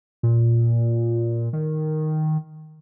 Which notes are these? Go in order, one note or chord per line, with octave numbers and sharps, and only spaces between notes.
A#2
D#3